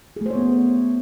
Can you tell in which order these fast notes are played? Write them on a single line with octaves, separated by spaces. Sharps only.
G#4 A3 C5 C#5 B3